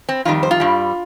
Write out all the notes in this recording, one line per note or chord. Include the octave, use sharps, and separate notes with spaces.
C4
F2 D#3 G3 F4
C5
F4
G2 G3